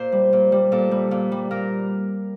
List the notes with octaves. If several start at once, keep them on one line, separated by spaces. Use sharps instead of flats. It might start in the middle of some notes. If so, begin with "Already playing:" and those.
Already playing: A#2 C5
G3
A#2
G3
A#2 A4
G3
A#2
G3
A#2 A#4